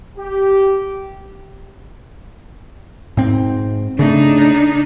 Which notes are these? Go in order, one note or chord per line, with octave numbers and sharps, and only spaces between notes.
G4
G#2 C4
C#3 A3 D4 D#4